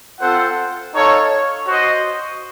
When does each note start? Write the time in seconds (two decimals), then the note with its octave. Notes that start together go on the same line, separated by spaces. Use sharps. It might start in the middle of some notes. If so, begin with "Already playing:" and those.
0.20 C4 F4 A4 C5 F#5
0.93 D#4 A4 C#5 F5
1.67 F#4 C5 D#5